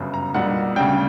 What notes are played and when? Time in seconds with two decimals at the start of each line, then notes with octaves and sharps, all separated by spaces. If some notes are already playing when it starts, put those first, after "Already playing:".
Already playing: G1 F#2 C#3
0.14 A#5
0.34 B1 A#2 G3 F#5
0.76 D2 C#3 G3 G5